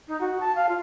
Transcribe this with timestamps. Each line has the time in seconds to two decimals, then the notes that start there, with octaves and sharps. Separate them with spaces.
0.08 D#4
0.20 F#4
0.40 A5
0.55 F5
0.69 F4